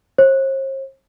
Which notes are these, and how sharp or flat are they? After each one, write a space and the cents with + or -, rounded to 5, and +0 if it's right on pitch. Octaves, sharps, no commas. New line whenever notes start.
C5 +45